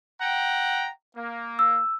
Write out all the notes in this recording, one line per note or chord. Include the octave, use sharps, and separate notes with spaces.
F#5 G5 A#5
A#3
E6